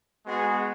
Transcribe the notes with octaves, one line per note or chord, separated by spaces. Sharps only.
G#3 B3 F#4 G#4